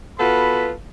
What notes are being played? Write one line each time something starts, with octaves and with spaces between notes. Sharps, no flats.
B3 F4 F#4 A4 B4 B5